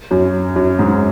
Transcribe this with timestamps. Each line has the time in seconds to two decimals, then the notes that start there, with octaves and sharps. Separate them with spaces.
0.11 F#2 F#3
0.56 F#2 F#3
0.79 G#2 G#3